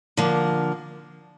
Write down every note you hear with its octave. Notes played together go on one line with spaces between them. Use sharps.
D3 F3 A#3